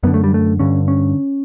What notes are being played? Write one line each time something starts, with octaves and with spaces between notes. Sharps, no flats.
F#2 D3 B3
A3
G3
A3
G2 D3 C#4
C#4